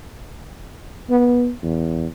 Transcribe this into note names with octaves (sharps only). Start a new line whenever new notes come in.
B3
E2